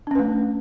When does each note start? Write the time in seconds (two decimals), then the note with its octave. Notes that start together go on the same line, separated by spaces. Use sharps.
0.07 D4
0.11 C#4
0.15 B4
0.19 A3